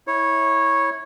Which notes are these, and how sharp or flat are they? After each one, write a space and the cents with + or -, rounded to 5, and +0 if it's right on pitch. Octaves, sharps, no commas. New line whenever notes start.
E4 -20 C#5 -10